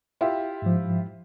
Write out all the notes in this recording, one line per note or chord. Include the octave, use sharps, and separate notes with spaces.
E4 F4 G4
G#2 F3